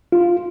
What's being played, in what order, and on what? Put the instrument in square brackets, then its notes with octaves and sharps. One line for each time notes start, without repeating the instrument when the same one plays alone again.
[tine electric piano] F4